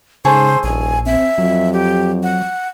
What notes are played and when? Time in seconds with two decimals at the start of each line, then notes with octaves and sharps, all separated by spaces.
0.25 G#2 C#3 G#4 A4 C5 C#5
0.64 D#1 A#1 G#5
1.06 C4 E5
1.38 F2 F#3
1.73 G4
2.23 F#5